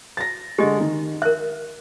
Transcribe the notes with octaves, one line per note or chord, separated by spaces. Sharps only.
A6 A#6
D3 G#3 G4 D#5
D#3
A#4 E5 F#6